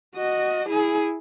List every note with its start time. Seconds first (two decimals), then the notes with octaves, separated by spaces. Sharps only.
0.15 F#4 D#5
0.70 E4 G#4